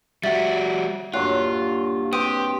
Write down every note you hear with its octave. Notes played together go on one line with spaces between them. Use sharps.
G3 F#4 E5 A6
G2 A#2 F#3 F4 F#6
C4 G4 B4 D#6 D#7